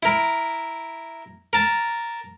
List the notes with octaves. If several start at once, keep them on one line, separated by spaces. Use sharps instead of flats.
E4 A#4
A#4 A5